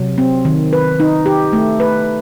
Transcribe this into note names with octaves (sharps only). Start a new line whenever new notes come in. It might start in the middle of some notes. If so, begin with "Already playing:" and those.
Already playing: C3 F#3
C4
D#3
B4
D#4
G4
A3
B4